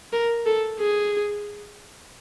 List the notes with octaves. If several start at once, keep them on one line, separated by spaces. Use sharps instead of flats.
A#4
A4
G#4